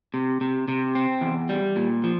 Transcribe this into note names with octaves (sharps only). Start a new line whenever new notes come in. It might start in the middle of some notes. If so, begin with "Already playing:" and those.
C3
C3
C3
C4
E2
G3
A#2
F3